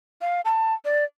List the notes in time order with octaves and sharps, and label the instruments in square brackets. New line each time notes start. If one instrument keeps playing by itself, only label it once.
[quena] F5
A5
D5